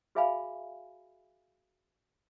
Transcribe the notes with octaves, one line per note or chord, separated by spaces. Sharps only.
F#4 G#4 E5 F5 G#5 B5